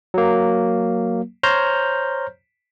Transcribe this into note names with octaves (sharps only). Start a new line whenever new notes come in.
F#3 A#3
C5 C#5 A#5 F6 G6